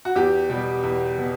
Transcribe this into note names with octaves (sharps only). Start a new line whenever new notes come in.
F#4
E2 G4
B2 G3
E2
B2